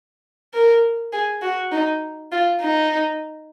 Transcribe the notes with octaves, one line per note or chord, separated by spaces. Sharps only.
A#4
G#4
F#4
D#4
F4
D#4